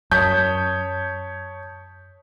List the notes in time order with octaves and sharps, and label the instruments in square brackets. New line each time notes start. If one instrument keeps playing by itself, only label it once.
[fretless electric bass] F#2 [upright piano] C#5 [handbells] A5 D#6 B6 [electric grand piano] G6